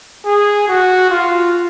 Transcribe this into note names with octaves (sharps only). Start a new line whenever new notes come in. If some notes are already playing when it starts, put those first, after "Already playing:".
G#4
F#4
F4